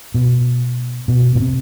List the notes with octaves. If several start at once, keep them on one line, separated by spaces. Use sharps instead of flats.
B2
B2
B2
C3